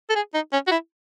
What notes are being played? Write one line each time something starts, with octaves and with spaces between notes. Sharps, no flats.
A4
G#4
D#4
C#4
F#4
E4